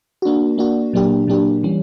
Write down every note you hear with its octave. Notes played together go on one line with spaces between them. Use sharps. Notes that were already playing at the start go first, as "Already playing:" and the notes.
A#3 D4 F#4
A#3 D4 F#4
A#2 F#3 A#3 D4 G4
A#2 F#3 A#3 D4 G4
E3 G3 C#4